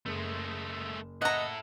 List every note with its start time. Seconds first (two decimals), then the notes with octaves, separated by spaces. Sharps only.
0.06 F#1 G#3 A3
1.22 E4 A4 D#5 F#5 A#5